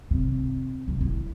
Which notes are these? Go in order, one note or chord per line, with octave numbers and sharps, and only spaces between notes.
C3
C3
E4